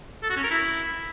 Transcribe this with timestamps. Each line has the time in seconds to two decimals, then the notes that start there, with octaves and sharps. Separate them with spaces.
0.23 A4
0.30 F#4
0.37 C#4
0.44 A#4
0.51 E4